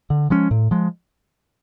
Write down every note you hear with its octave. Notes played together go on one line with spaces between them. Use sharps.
D3
F3 G#3 C#4
A2
F3 G#3